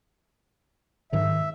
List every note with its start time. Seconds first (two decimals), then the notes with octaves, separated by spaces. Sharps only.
1.12 G#2 D#3 F#3 E5